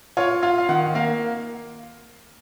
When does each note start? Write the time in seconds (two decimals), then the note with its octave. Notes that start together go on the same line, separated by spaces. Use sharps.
0.17 F4 C#5
0.42 F4 F5
0.58 F5
0.69 D#3 F#5
0.95 A#3 F5